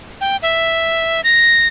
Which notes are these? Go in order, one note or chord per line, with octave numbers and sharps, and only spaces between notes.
G5
E5
A#6